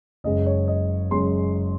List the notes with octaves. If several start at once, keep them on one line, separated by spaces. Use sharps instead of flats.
F#1 F#2 C#3 G#3 D#5
C#5
D#5
F#1 F#2 C#3 G#3 C6